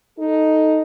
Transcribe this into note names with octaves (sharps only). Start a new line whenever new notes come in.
D#4 A4